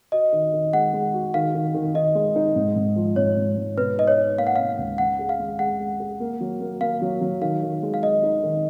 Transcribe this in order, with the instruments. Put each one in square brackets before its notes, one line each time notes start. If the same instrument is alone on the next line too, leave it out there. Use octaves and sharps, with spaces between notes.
[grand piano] F#4 [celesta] D#5
[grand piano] D#3
D#3
[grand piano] G#3 [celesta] F#5
[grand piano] G#3
F#4
[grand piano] D#3 [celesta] F5
[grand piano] D#3
D#3
[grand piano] D#3 [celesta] D#5
[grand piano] G#3
D#4
G#2
G#2
F3
[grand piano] G#2 [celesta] C#5
[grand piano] G#2
G#2
[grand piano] B2 [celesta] B4
[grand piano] D#4 [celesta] D#5
[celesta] C#5
[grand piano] D#4
[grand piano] A#3 [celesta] F5
[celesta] F#5
[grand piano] B2 [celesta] F5
[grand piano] C#2
[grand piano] C#3 [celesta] F#5
[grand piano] G#4
[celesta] F5
[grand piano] G#3
[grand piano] G#3 [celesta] F#5
[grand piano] G#3
G#4
A#3
F#3
A#3
[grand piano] A#3 [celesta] F5
[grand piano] F#3
F#3
[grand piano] D#3 [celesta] F5
[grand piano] D#3
G#3
[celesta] F5
[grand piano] G#3 [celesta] D#5
[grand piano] D#4
D#3